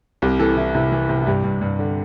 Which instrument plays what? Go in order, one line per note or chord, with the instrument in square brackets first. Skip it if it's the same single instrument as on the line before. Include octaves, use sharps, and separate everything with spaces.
[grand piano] C2 G4
E3 A4
E3 E4
C3 E4
E3
C3
E4
G2 G4
G2
G2
D3